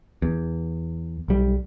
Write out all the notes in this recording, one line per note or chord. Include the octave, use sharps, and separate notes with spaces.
E2
B1 G3